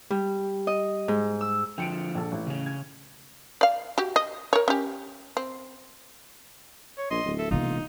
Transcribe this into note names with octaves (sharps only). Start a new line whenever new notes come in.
G3
D#5
G#2
E6
D3 F3 G5 C#7 D7
A#1 A4
A1
C#3 C#4
G#6
D5 F5
F#4 G4
D#5
A#4 C#5
C#4 G4
C4
C#5
A#1 D#5 C6
D1
A4 E5
E1 C3 A#3 D#4 F4